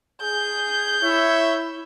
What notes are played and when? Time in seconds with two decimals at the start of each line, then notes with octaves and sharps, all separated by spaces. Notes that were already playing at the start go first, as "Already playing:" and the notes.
0.21 G#4 G6
1.02 E4 C#5 E5